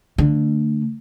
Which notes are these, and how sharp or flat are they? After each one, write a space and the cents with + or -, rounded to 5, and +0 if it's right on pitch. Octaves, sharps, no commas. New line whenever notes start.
D3 +5 A3 +25